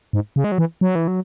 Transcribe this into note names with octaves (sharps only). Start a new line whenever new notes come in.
G#2
C#3
G#3
F#3
E3
F#3
E3
F#3